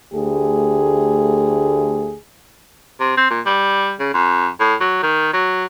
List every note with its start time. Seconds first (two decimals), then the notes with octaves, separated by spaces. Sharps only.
0.13 D2 A3 G4 G#4
3.00 C3
3.17 C4
3.31 A#2
3.46 G3
4.00 C#3
4.14 F2
4.60 A2
4.81 F#3
5.03 D#3
5.33 F#3